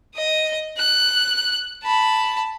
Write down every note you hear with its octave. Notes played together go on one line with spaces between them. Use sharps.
D#5 D#6
F#6
A5 B5